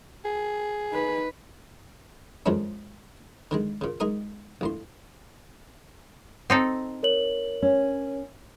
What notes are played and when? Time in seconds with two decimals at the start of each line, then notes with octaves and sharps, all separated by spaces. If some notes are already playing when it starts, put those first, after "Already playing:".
0.25 G#4
0.91 D#4 B4
2.46 F2 A#2 F3 G#3 C#4 D4
3.51 D3 D#3 G#3
3.81 A#2 C#3
4.00 G#3 D#4 A#4 D#6
4.61 A#1 A2 C6
6.50 C4 D#4 A4
7.03 A#4 C#5 F#7
7.62 C#4